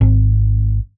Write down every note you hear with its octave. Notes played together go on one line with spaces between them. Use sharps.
G#1